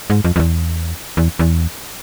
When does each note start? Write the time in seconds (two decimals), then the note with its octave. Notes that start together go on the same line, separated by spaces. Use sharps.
0.10 G#2
0.25 F2
0.36 F2
0.40 E2
1.17 E2
1.39 E2